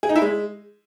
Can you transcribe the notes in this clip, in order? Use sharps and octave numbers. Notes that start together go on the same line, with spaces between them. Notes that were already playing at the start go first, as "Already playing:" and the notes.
G#4
D#4
E4
G#3